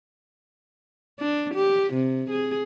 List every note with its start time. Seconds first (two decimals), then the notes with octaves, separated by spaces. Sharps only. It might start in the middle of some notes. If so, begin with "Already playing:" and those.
1.19 D4
1.55 G4
1.94 C3
2.30 G#4